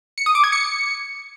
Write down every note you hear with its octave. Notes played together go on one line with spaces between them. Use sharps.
C#7
D#6
D6
G#6
C#7